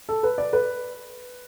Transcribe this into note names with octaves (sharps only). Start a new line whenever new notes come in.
A4
B4
D5
B4